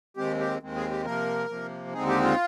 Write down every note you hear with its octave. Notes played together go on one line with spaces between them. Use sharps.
D#2 D#3 G#3 C4 G4
G4
D#2 D#3 G#3 C4
G#4
G4
C3 F3 A#3 A#4
C3 F3 A#3
D#2 D3 G#3 C4 D#4 G#4
G4
F4